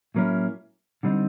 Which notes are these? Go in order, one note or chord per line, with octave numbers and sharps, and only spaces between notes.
A2 F#3 A#3 C#4 E4
D3 G3 C4 D#4